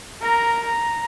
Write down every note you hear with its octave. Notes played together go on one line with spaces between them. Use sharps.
A#4 A#5
A#5